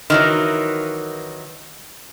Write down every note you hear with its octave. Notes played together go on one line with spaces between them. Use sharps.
D#3 E3 F#3